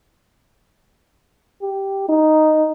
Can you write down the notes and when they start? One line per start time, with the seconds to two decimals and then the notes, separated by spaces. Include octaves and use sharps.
1.62 G4
2.09 D#4